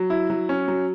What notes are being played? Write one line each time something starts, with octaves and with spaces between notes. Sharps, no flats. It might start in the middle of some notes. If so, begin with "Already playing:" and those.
Already playing: F#3
E4
F#3
C#4
F#3